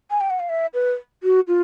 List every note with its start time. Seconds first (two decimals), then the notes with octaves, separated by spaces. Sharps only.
0.11 G#5
0.21 G5
0.30 F#5
0.40 F5
0.49 E5
0.74 B4
1.23 F#4
1.48 F4